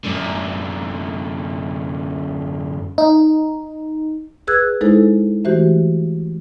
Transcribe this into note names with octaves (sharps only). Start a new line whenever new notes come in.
F#2 D3
D#4
G#4 B4 E6 F#6 G#6
G#3 D#4 E4 A4 C5
E3 A3 F#4 G4 C5 E5